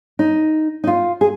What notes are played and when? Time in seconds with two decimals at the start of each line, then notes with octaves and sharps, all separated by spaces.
0.19 D#4
0.84 D#4
0.87 F4
1.21 G#4